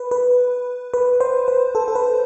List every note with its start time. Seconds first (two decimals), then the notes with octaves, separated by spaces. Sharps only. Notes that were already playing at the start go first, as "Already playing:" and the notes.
Already playing: B4
0.11 B4
0.94 B4
1.20 C5
1.48 B4
1.75 A4
1.88 A4
1.95 B4